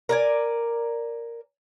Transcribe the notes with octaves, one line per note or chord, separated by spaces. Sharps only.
A#4 D5 G#5